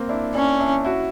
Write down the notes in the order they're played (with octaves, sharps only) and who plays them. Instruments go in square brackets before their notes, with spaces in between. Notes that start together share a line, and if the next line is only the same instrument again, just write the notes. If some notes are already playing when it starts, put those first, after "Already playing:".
Already playing: [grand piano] A#3 C4
D4 E4
[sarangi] C#4 [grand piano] D4 E4
[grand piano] D4 E4
E4 F#4